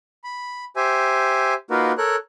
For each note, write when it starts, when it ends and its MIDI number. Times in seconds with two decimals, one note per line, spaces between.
0.24 0.64 83
0.76 1.54 67
0.76 1.54 72
0.76 1.54 76
0.76 1.54 80
1.70 1.92 58
1.70 1.92 63
1.70 1.92 65
1.70 1.92 66
1.70 1.92 70
1.70 1.92 71
1.98 2.16 69
1.98 2.16 70
1.98 2.16 73
1.98 2.16 90